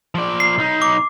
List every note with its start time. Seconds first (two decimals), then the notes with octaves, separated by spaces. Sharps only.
0.15 F3 D5
0.40 C7
0.58 B1 D#4
0.82 D6